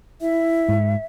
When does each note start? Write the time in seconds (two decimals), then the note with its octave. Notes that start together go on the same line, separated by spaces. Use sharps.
0.21 E4 E5
0.69 G#2